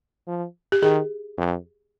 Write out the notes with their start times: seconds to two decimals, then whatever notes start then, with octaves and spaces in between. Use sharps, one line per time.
0.27 F3
0.72 G4
0.82 D#3 G#4
1.37 F2